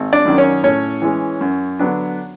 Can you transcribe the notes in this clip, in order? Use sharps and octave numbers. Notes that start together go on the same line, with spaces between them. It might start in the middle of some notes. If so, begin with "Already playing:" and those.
Already playing: G#1
D4 D5
F#2 D#3 F#3
C#4 C#5
A2 C#4 C#5
E3 G#3 C#4
F#2
D3 F#3 B3 D4